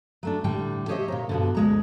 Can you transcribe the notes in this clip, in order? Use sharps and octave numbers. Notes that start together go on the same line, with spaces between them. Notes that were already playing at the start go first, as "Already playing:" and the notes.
F#3 A3 D4
A2 D3 G3 G5
G4 G#4 C5 C#5 D#5 E5
A#2 A#5
G2 B2 D3
D2 G#3 A#5